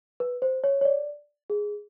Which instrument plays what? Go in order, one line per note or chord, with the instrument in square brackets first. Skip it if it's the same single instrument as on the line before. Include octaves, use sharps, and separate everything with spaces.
[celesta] B4
C5
C#5
C#5
D5
G#4